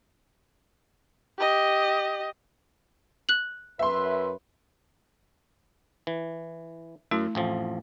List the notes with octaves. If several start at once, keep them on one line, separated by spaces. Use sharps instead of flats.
G4 D#5
F#6 F#7
F#2 B4 E5 C6
E3
F#2 A3 E4 A5
A1 F2 F3